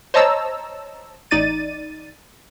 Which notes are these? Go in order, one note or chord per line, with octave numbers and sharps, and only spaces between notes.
C5 C#5 D#5 A5 A#5 E6
A1 D#4 D5 A6 D#7